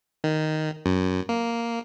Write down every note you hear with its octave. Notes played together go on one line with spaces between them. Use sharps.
D#3
F#2
A#3